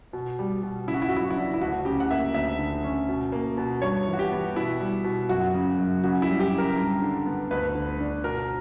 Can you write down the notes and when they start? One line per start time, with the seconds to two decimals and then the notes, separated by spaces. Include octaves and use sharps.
0.13 B2
0.39 G3
0.63 B2
0.87 C#3 E4
0.94 F#4
1.02 E4
1.09 F#4
1.12 F#3 E4
1.23 F#4
1.30 E4
1.36 D4
1.54 E4
1.61 D2 F#4
1.85 C#3 G4
2.00 F#5
2.11 A#3 E5
2.34 D2 E5
2.59 D3
2.84 C#4
3.08 B2
3.32 A#3
3.58 B2
3.82 G2 C#5
4.07 E3
4.13 F#4
4.19 G4
4.31 B3
4.56 B2 E4
4.80 G3
5.04 B2
5.29 F#2 F#4
5.54 C#3
5.78 F#2
6.03 C#3 F#4
6.22 E4
6.28 G3
6.40 G4
6.53 C#3
6.58 A#4
6.77 G2
7.02 D3
7.26 B3
7.51 D2 B4
7.75 D3
8.00 D4
8.24 B2 A#4